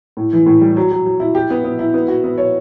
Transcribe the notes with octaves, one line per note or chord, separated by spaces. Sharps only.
A2
E3
A2
G3
F#3
F#3
F#3
E4
G4
B3
B3
E4
B3
F#4
B3
C#5